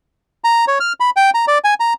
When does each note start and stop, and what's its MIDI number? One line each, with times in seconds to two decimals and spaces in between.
0.44 0.65 82
0.68 0.79 73
0.80 0.93 89
1.00 1.10 83
1.16 1.30 79
1.34 1.45 82
1.48 1.58 74
1.64 1.74 80
1.80 1.93 82